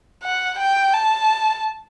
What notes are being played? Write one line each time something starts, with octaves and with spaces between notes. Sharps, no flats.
F#5
G5
A5